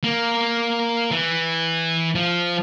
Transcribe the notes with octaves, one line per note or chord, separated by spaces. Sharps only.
A#3
E3
F3